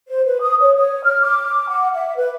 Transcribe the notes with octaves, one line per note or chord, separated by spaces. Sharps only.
C5
B4
D#6
C#5
C#5
F6
D6
F#5
E5
B4